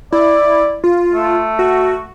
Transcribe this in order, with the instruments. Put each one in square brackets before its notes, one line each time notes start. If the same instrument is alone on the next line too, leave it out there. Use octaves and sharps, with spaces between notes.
[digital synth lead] E4 [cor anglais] D5
[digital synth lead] F4
[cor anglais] A3
[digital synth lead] F#4